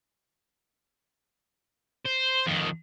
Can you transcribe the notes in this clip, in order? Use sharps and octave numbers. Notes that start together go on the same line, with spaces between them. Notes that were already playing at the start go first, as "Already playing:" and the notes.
C5
F2 D#3